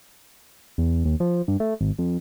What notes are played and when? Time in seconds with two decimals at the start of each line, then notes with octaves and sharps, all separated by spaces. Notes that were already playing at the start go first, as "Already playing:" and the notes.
0.78 E2
1.05 D#2
1.20 F3
1.48 G2
1.60 A3
1.81 G#1
1.99 F2